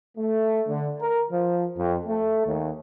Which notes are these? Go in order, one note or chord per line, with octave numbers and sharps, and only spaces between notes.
A3
D3
A#4
F3
F2
A3
D#2